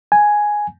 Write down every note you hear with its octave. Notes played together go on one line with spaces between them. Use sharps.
G#5